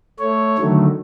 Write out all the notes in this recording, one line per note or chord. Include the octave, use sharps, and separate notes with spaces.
A3 C#5
D3 D#3 F#3 A3